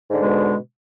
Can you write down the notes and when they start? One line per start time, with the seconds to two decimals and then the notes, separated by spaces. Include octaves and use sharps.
0.10 G#2
0.13 D3
0.17 G#3
0.21 B2